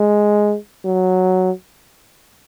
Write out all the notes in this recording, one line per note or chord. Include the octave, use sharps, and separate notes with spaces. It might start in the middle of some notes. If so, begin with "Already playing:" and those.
Already playing: G#3
F#3